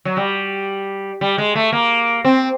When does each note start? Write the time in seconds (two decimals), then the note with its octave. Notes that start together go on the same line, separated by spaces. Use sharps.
0.05 F#3
0.17 G3
1.21 G3
1.38 G#3
1.55 A3
1.72 A#3
2.25 C4